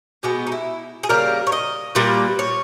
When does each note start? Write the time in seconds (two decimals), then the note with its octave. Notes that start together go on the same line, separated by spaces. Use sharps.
0.23 B2 G#3 B3 G4
0.47 D#4
0.52 E4
1.03 G#4
1.09 C#3 G3 A#3 A#4
1.47 C#5
1.52 D#5
1.95 A#2 G3 A#3 B4
2.39 C#5